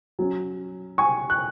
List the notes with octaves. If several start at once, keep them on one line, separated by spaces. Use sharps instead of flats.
F#3 C#4
G#5 C#6
F#6